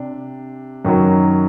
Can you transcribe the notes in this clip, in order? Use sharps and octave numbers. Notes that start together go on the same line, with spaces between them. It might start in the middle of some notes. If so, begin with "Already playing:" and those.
Already playing: C3 D4
F#2 D#3 F#3